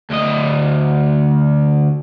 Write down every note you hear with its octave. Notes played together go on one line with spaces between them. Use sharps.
D2 D#5